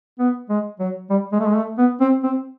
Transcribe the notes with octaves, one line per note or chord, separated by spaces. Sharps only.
B3
G#3
F#3
G3
G#3
A3
G#3
A3
B3
C4
C4